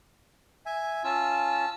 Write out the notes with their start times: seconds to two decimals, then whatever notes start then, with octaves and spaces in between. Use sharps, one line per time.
0.66 E5 G#5
1.04 C#4 F4 A5 E6